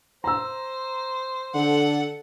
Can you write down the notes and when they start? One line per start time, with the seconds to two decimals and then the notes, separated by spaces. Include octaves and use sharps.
0.24 C5 A#5 E6
1.54 D3 A4 F#5